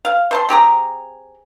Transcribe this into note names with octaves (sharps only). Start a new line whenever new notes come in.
F5
C5 A5 C6
C4 G4 G#4 A#5